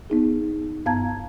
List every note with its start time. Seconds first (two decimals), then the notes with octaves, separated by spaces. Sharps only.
0.10 B3 D#4 G#4
0.86 G2 B3 F5 A5 A#5 G#6